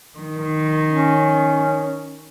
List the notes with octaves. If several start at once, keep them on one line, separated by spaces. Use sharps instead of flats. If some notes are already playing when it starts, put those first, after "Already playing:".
D#3
C#4